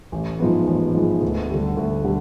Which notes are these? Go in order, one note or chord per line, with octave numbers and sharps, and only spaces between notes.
A1
G#2 F3 G#3 B3
A1
G#2 F3 G#3 B3
D2
D3 G3
D2
D3 G3